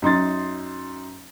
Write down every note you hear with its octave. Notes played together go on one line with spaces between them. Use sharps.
F#2 D#4 C6 A6